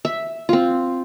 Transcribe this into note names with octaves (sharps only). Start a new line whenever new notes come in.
E5
C4 F4